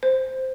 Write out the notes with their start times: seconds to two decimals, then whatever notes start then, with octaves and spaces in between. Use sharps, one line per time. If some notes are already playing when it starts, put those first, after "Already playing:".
0.03 C5